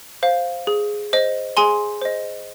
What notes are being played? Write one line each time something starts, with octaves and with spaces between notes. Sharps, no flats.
C5 F5
G#4
C5 D#5
G#4 G#5 C6
C5 D#5